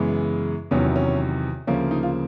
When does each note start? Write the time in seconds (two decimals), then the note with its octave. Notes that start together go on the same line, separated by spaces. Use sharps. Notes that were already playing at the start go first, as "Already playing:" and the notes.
Already playing: F#2 C#3 E3 G#3 B3
0.71 E2 C3 D#3 F#3 B3 C#4
0.96 C#4
1.67 D2 C#3 F3 A#3 C#4
1.91 D#4
2.03 F4